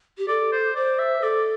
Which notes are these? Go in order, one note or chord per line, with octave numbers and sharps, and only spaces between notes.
G4
A4 D5
C5
C5 D5
E5
A4 D5